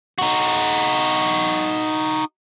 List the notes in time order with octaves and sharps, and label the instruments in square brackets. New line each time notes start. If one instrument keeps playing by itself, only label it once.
[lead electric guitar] D#4 F#4